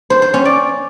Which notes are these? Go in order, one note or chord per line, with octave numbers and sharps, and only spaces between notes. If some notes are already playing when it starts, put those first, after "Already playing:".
C5
C5
C#4
D5